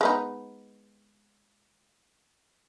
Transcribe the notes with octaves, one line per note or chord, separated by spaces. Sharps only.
G#3 B3 D#4